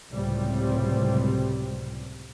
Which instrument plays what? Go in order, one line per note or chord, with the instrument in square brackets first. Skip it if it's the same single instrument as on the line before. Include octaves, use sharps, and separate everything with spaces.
[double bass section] C#2 A2 C3 F#3 G3 C4